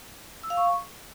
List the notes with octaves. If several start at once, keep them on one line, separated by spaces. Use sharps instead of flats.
E6
F5
C#6